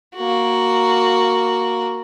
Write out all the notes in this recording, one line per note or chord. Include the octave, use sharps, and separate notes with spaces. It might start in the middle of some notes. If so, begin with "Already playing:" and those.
A#3 F#4